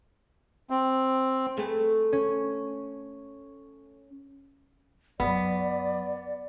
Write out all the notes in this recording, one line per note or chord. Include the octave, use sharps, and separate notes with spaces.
C4
A3 G#4 B4
C#4
F#2 F#3 B3 D5